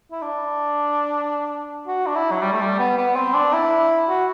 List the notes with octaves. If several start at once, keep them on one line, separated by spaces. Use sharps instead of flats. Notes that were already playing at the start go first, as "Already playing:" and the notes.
E4
D4
F#4
D4
E4
F#3
G3
A3
G3
B3
B3
C4
D4
E4
F#4